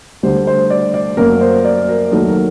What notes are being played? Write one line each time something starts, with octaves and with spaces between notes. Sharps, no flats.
D2 D3 G3 C5
C5
D5
D5
F#2 F#3 A#3 A#4
C5
D5
A#4
D#2 D#3 F#3 A3 A#4
A#4